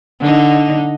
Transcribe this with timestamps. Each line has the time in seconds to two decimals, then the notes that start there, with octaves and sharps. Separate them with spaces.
0.21 D3 D#4